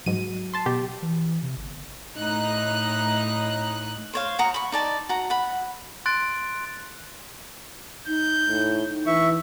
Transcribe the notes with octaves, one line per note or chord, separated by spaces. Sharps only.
G#2 F#3 D#7
A5 C6
B2 G4
E3
C3
G1
A2 D#4 F#6
C5 C#5 F5
F#4 F#5 A#5 D#6
B5 C#6
D#4 D5 A5
F#4 A#5
F#5 B5
C6 F#6 A6 D7
D#4 G6
A2
E3 E5 C#6